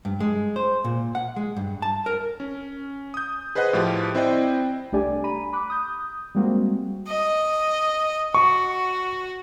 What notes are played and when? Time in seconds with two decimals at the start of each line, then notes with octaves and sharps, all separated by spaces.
0.05 G2
0.20 G#3
0.56 C5
0.84 A#2
1.15 F#5
1.36 G#3
1.57 G2
1.82 A5
2.06 A#4
2.40 C#4
3.14 D#6 G6
3.55 G#4 B4 C5 D#5 F#5 F#6
3.73 A2 F3 F4 G4
4.14 C4 E4 C5 D5 D#5 G5
4.92 C2 A3 D4 G4 D5 G#5
5.24 A#5 B5 D#7
5.53 B5 D6 F#6
5.70 D#6 G6
6.35 G3 G#3 A#3 C4 F#4
7.07 D#5
8.35 F#4 C#6